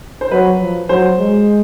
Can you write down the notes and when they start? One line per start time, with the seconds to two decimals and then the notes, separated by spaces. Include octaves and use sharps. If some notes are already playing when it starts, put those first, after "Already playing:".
0.21 C5
0.31 F#3 B4
0.61 F3
0.89 F#3 C5
1.19 G#3